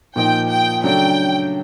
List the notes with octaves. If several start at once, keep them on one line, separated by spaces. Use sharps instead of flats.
A#2 F3 A#3 D#4 G5
G5
C#3 F#3 A3 D4 G5